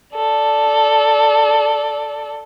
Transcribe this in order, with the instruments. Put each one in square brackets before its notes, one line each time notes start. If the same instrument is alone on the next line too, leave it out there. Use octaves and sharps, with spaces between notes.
[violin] A4 D5